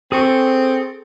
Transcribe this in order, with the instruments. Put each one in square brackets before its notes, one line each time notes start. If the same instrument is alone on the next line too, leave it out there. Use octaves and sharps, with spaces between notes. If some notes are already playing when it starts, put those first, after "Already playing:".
[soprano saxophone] C4 [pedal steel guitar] G#4 A4 C#6